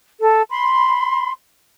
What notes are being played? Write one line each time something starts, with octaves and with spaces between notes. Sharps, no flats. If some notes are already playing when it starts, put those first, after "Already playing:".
A4
B5 C6